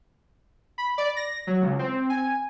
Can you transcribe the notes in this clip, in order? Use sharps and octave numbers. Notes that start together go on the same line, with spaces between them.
B5
D5
A#6
F#3
C#2
C4
G#5